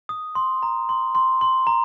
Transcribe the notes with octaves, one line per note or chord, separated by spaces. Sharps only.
D#6
C6
A#5
C6
C6
C6
A#5